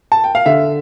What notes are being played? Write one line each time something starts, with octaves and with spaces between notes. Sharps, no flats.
A5
G5
F5
D3 E5